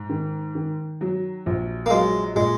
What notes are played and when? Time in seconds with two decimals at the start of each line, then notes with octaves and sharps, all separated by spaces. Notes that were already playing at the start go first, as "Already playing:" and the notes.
Already playing: G#2
0.09 D#3
0.55 D#3
1.01 F#3
1.46 A#1
1.86 A#3
1.90 F#3 G#3
2.36 A#2 G#3